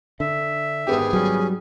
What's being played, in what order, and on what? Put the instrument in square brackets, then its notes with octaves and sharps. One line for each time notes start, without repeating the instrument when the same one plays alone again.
[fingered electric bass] D3 [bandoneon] E5
[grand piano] G#1 B3 G4 [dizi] G#4
[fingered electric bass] F#3 G3 [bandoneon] C#4